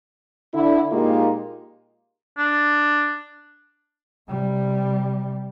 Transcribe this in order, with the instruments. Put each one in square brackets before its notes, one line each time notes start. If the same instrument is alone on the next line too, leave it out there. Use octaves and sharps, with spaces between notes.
[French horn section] D3 E4
A#2 G#3 A#3 D#4 F4 G4
[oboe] D4
[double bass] C3 G3